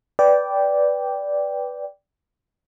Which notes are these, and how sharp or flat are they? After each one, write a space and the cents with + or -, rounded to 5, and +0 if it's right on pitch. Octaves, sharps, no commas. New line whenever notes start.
B4 +0 D5 -10 G5 +0